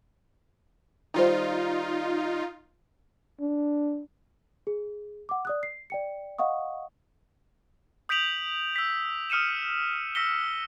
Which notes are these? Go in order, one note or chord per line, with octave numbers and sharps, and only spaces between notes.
D#3 G3 D#4 F4 C5
D4
G#4
F#5 D6
D5 D#6 F#6
C7
D5 G5 C#7
D#5 F5 F#5 C#6 D#6
D#6 G6 B6 D7 F7 F#7
E6 B6
D#6 F6 C#7 D#7 E7
E6 A#6 B6 C#7 G7